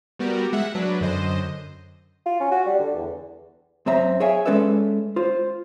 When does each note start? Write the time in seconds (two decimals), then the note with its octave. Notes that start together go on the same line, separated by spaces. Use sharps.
0.19 G3 B3 F#4 G4 A#4
0.53 G#3 E5 F#5
0.75 F#3 D4 B4
1.01 F#2 D3 C5 D#5
2.26 F4
2.40 C#4
2.51 F#4
2.66 G3
2.79 D3
2.95 E2
3.87 F#2 C4 E5 A#5
4.20 G#4 C#5 E5 F5 G5 G#5
4.46 G#3 C#4 A4 B4 D5 E5
5.16 F4 C5